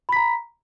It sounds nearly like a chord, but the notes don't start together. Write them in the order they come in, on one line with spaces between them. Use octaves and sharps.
B5 B6 A#5